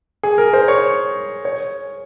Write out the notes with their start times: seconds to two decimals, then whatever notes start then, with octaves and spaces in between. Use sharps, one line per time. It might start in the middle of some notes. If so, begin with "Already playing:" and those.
0.23 G#4
0.38 A#4
0.53 C5
0.68 C#5
1.45 C#5